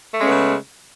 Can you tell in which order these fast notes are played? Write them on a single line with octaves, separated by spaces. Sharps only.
A3 G#3 C#4 B3 C#3